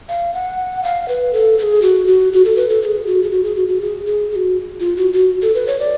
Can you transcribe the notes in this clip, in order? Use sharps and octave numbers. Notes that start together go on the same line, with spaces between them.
F5
F#5
F5
B4
A4
A4
G#4
F#4
F#4
F#4
A4
B4
A4
A4
G#4
F#4
G#4
F#4
G#4
F#4
F#4
G#4
G#4
G#4
F#4
F4
F#4
F#4
A4
B4
C#5
D5